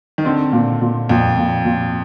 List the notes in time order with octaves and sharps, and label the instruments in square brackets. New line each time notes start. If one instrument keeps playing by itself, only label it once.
[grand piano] D#3
[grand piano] D3 [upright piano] C4
[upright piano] A#2
A#2
[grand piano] F2 [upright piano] A#2
[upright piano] A#2
A#2